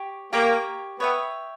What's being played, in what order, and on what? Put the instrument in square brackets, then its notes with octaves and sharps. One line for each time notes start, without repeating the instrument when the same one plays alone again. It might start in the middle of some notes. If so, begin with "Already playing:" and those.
Already playing: [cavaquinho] G4 C#5 G5
[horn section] A#3 [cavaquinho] G4 C#5 G5 A#5
[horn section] B3 [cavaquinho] C#5 E5 G5